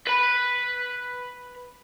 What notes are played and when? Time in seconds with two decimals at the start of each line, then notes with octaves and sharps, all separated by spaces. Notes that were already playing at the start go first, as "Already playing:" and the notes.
0.07 B4 B5